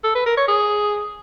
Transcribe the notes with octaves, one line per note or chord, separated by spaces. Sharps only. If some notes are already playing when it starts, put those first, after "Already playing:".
A4
B4
A#4
C#5
G#4